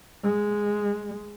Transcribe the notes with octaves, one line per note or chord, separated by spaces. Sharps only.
G#3